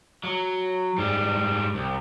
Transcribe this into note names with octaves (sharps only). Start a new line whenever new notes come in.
F#3
G#2 G3
C2